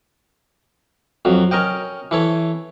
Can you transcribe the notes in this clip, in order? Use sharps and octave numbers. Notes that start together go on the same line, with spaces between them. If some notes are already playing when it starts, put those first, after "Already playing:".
F2 F#3
C#4 A#4 D#5 G5
E3 A4 C#5